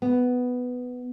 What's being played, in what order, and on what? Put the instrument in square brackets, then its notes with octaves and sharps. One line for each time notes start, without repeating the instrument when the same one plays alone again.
[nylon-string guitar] B3